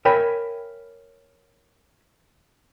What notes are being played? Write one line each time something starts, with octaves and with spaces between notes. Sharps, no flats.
A#4 C#5 E5 G5 G#5 B5